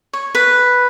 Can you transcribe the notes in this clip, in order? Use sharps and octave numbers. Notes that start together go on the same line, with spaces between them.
C#5
B4